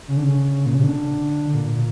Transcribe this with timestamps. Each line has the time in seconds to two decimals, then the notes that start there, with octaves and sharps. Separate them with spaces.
0.08 C#3
0.17 D3
0.24 C#3
0.66 A#2
0.75 C#3
0.84 D3
1.54 A#2
1.64 A#2
1.74 A#2